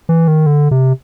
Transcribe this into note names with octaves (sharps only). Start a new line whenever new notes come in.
E3
D#3
D3
C3